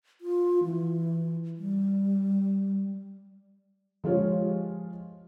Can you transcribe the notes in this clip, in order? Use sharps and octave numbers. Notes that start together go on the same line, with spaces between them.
F4
E3
G3
F3 G#3 F4 G4 C#5